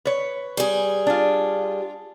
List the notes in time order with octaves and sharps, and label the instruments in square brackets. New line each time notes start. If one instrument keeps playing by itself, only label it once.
[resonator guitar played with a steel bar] B4 C#5
[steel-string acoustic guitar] G3 G#4
[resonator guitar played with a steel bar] D4 F4